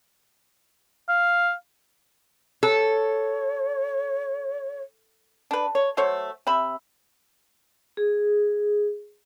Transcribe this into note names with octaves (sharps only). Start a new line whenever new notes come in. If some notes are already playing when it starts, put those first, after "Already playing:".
F5
A4 C#5
D4 B4
C#5
F#3 A3 C5 C#5
C3 E5 B5
G#4